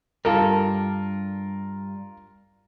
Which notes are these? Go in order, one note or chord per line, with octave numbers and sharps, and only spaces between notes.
G2 F4 A4 A#4